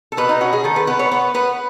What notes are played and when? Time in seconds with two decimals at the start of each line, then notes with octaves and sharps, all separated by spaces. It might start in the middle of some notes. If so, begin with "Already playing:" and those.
0.12 A4
0.17 B2 B4
0.29 D#4
0.41 C#4 F#4
0.53 G#4
0.64 D#3 A4
0.76 B4
0.87 B3 B4
0.99 C#5
1.11 B3 B4
1.34 B3 B4